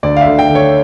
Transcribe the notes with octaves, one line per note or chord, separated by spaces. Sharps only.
D2 D5
F5
D3 E5
G5
D3
C#5